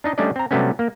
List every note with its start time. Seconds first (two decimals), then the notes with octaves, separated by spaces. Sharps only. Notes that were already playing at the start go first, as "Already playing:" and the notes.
0.04 D4 D#4 D#5
0.18 G3 A3 C#4 D4 D5 D#5
0.36 C4 A#5
0.51 C3 F#3 G3 A3 B3 C#4
0.79 A#3